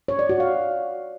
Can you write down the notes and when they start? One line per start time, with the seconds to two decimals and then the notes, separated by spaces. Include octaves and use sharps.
0.08 C#5
0.19 D5
0.29 F#4
0.40 F5